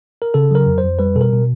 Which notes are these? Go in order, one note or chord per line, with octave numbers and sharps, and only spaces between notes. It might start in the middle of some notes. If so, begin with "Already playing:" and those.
A#4
C#3 A4
F#3 A#4
F2
C5
F2
G3 B4
B2 A4
A#4
B2